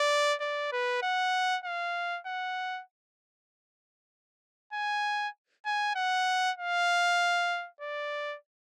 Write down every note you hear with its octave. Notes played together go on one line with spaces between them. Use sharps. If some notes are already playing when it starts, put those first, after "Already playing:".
Already playing: D5
D5
B4
F#5
F5
F#5
G#5
G#5
F#5
F5
D5